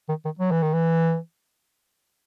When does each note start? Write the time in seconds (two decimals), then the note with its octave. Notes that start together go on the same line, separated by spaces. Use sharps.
0.09 D#3
0.25 D#3
0.39 F#3
0.51 E3
0.62 D#3
0.73 E3